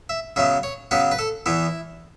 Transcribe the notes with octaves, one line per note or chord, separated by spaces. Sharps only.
E5
C#3 F#3 B3 E5
C#5
C#3 F#3 B3 B4
B4
A4
E2 E3 B3 E4